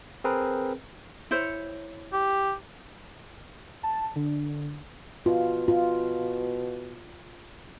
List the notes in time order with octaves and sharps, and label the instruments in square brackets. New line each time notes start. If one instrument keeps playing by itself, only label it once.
[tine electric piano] C4 G#4 A#4 B4
[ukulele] E4 C5 C#5
[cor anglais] G4
[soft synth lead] A5
D3
[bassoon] B2 [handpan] F4
[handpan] F4